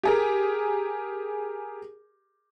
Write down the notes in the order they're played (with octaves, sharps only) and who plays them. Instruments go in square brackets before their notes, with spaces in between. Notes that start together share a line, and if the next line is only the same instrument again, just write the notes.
[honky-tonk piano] G4 G#4 A#4